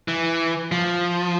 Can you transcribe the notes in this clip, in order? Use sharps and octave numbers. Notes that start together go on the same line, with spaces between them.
E3
F3